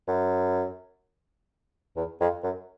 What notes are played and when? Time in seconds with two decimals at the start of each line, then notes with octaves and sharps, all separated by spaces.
0.08 F#2
1.96 E2
2.21 F2
2.44 F#2